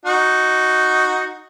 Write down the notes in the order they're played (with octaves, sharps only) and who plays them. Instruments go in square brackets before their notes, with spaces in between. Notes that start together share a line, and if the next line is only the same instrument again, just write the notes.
[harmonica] D#4 F#4